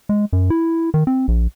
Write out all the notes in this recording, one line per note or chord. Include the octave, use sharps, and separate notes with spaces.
G#3
F#2
E4
D#3
C4
A#1